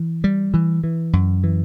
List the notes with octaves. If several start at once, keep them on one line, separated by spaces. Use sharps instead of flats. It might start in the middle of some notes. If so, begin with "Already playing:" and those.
Already playing: E3
G3
E3
E3
F#2
E3